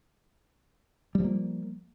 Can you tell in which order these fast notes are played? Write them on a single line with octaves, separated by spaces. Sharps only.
G3 F3 A#3